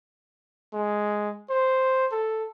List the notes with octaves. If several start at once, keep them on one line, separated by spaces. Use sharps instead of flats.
G#3
C5
A4